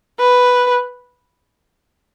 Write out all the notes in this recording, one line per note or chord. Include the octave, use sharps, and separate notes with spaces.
B4